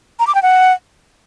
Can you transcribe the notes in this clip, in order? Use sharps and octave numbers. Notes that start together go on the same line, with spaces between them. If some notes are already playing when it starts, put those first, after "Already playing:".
A#5
D6
G5
F#5